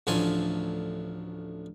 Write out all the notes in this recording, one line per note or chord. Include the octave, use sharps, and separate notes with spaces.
A1 D2 F3 A4 G#5 C6